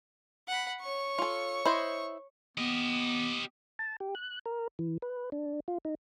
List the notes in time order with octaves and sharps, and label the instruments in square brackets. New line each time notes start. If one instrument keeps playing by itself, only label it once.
[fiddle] F#5 B5
C#5 C#6
[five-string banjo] F4 A4
E4 C5 D#5
[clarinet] B3 [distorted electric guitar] G4 D#5
[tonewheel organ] A5
G4
F#6
A#4
E3
B4
D4
F4
D#4